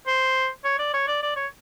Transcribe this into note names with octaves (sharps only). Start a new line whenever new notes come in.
C5
C#5
D5
C#5
D5
D5
C#5